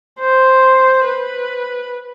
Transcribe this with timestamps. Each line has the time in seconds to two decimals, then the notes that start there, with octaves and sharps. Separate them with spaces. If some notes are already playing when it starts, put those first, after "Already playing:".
0.20 C5
1.05 B4